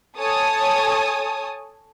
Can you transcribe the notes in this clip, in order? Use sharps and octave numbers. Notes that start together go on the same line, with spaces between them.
A4 C#5 G#5 A5 D#6